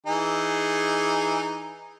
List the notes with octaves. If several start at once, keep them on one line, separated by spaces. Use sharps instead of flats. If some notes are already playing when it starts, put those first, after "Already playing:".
E3 D#4 G#4